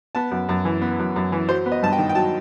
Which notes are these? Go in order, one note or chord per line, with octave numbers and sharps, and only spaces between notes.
B3 A5
F#2
F#2
E3
B3
F#2
F#2
E3
F#3 C5
B3
D#5
G2 A5
G5
D#3
G5
F#3 A5